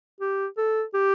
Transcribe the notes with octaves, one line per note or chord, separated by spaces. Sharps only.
G4
A4
G4